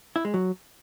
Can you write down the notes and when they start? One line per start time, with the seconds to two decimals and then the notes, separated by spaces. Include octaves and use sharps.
0.16 E4
0.25 G#3
0.34 F#3